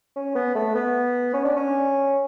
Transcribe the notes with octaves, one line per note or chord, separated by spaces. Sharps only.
C#4
B3
A3
B3
C#4
D4
C#4